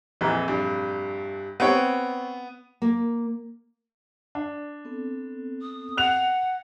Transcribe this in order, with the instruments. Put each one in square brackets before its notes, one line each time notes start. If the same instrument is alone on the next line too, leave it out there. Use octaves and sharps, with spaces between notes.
[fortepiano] A#1 F2 [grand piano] E3
[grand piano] G2
[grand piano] B3 [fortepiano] C4 C#5 G5
[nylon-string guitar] A#3
[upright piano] D4 [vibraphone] D5
[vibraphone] B3 C4 A4
[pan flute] D#6
[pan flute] F#5 [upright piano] F#6 F7